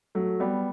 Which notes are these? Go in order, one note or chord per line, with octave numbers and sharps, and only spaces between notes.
F#3 A3
G3 B3